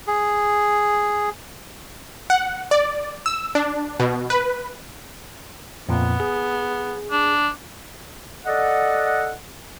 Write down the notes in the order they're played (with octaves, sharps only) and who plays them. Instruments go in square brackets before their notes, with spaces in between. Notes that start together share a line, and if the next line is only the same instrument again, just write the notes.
[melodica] G#4
[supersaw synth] F#5
D5
E6
D4
B2
B4
[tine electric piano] F2 A#2 [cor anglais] B3
[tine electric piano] G#4
[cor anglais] D4
[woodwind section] A4 D5 D#5 F#5